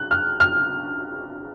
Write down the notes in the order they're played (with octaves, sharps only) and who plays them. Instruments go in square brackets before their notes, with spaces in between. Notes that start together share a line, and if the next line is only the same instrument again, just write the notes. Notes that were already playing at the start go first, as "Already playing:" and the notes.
Already playing: [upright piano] F#6
F6
F6